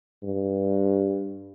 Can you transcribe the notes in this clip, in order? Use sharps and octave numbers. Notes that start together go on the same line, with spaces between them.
G2